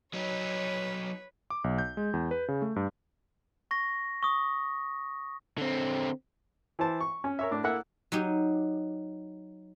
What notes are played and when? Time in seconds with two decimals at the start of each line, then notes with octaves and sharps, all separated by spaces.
0.13 F#3 D#4 B4 C#5
1.50 D6
1.64 B1
1.78 G6
1.97 G#3
2.13 E2
2.31 B4
2.48 C#3
2.62 A3
2.76 G2
3.71 C#6 A#6
4.23 C#6 D#6
5.58 D3 C4
6.79 E3 E4 C5 A5
7.01 C#6
7.24 C#4
7.39 A#4 C#5 E5
7.51 A2 D4
7.64 A#3 E4 A4 E5 F#5 F#6
8.12 F#3 D#4 G4